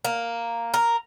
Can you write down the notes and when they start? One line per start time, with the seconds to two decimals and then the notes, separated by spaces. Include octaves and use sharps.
0.05 A#3
0.74 A#4